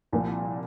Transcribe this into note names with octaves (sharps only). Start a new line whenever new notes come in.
C2 A#2 F3